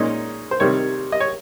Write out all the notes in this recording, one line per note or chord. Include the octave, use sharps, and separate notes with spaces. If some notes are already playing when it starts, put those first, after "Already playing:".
Already playing: A#2 G#3 C#4 D#4
C5
C3 D#3 G3 C#5
D#5
C#5